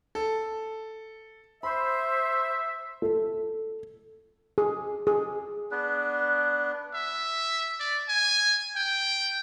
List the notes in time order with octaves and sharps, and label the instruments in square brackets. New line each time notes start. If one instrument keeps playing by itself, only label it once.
[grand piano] A4
[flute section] C5 [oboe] E5 [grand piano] B5
[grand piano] A4
[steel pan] G#4
G#4
[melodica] B3 D4 B4
[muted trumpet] E5
D5
G#5
G5